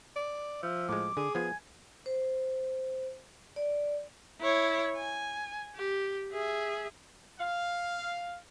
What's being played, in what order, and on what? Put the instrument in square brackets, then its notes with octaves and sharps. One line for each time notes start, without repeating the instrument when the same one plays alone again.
[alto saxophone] D5
[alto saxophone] F3 [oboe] E5
[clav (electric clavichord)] A2 G#3 [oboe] D6
[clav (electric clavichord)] D3 [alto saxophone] G#4
[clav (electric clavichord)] F3 B3 F4 [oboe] G#5
[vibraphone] C5
D5
[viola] E4 C#5
G#5
G4
G#4 E5
[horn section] F5